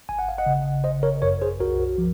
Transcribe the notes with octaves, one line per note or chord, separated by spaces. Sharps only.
G#1 G#5
F#5
F5
D#5 F#5
C#3
G#1 C5 D#5
A#4 C#5
F#2 A#4 C#5
G#4 C5
C2 F#4 A#4
F3